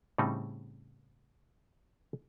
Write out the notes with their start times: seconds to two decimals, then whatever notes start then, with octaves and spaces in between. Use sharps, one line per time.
0.18 A2 C#3 G3 C4 D#4